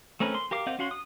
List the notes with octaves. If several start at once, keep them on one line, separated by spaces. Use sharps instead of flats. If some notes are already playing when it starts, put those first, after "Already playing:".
A3 C4 C#4 A#4 B4
C6
G4 A#4 F5 D6
C4 D#5 F5 F#5 G6
C#4 F#4 F5 F#5 C6
D#6